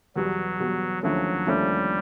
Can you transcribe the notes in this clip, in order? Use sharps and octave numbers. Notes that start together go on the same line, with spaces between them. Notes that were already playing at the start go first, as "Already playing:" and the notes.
E2 B2 F#3 G3
E2 B2 G3
D#2 D3 F3 F#3 A3 C#4
D#2 D3 F3 G3 A3 C#4